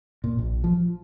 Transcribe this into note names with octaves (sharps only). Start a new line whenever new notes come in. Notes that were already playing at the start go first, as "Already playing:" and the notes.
A#2
A#1
F3